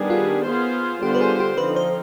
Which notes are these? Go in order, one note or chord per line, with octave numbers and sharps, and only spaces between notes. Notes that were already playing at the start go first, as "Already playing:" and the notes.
Already playing: D#3 G3 B3 D4 G#4
F4
B3 F4 G#4 C5
D3 G3 B3 F4 G4 C5
B4
G#4
G4
D3 F3 C4 D#4 B4
C5